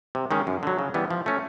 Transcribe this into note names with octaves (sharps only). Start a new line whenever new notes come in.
C3
D#3 G#3 C#4
F#2
D3 F#3
C#3
E3 G3 B3
F3
A3 C#4